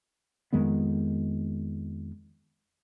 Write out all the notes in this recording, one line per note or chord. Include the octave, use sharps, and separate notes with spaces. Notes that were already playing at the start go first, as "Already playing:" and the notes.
F2 D#3 G#3 B3